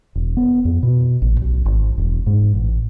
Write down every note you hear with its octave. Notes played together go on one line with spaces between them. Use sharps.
E1
B3
F2
B2
A1
B1
G#1
E1
G#2
A1